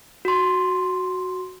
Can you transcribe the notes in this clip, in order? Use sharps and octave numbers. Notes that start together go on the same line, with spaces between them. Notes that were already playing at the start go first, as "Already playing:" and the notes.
F#4 C6